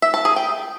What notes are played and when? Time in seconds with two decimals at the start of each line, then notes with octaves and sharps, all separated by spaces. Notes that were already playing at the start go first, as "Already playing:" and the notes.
0.02 E5
0.14 A5
0.25 G#4
0.36 G5